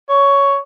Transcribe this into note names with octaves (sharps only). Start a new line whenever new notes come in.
C#5